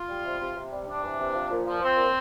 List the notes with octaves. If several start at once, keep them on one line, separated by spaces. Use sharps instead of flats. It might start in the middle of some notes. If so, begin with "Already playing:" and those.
Already playing: F4
G3
C3
C3
C3
G3
C3 D4
E3
C3
F3
A#2
F3
F3 C4
A#2